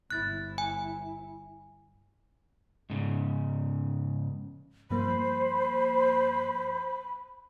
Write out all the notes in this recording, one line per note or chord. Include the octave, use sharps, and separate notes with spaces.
G1 E4 F#6 A6
G#5
G#2 C#3
G2 F3 A#3 C5 B5